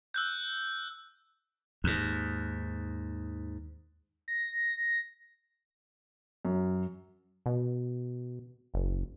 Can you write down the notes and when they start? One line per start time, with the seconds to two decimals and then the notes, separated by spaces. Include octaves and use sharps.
0.14 E6 F#6 G6
1.84 D#2 G#2
4.28 A#6
6.45 F#2
7.46 B2
8.74 F#1